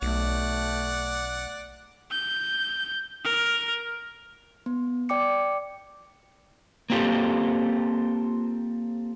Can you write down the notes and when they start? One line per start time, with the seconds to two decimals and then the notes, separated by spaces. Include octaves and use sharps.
0.02 B1 A3 D5 F#5
2.10 G6
3.24 A#4
4.66 B3
5.09 D5 G5 D6 C#7
6.90 A#3 C4 F4 G4 A4